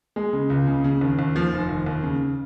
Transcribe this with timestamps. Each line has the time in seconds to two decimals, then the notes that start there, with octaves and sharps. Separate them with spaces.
0.16 G#3
0.33 C#3
0.50 C#2
0.67 C#3
0.84 C#3
1.01 D#2
1.19 D#2
1.36 F3
1.53 F1
1.69 D#2
1.86 D#2
2.03 C#3